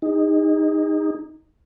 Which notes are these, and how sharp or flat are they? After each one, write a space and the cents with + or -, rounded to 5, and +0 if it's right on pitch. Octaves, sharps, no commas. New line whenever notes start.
D#4 +0 G#4 -40